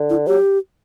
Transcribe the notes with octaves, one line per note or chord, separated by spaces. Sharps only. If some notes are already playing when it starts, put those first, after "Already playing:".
Already playing: D3
E4
F#3 G4